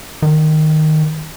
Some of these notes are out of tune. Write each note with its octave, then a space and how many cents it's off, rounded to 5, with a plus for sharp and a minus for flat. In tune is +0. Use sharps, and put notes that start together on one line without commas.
D#3 -5